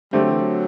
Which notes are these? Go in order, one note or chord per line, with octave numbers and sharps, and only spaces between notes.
D3 G3 A3 C4 G4
F#3
E3
F#3